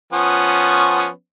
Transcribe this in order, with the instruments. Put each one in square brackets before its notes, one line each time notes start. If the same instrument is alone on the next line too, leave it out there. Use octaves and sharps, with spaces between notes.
[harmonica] F3 B3 C#4